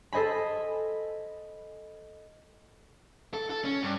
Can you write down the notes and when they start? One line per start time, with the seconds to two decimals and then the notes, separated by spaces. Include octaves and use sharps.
0.13 A4 C5 D#5 G#5 B5
3.33 A4
3.50 A4
3.65 C#4
3.83 G2